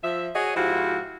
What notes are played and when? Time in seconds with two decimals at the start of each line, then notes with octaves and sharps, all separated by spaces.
0.04 F3 E5
0.35 F#4 G#4 C#5 D#5
0.56 G#2 F3 E4 F#4 G4 F5